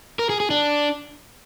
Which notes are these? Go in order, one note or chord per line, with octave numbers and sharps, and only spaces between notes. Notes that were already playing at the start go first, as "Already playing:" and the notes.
A#4
G#4
G#4
D4